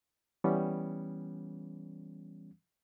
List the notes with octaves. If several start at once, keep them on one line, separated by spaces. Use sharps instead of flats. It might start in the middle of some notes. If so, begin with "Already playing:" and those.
E3 G3 B3 C#4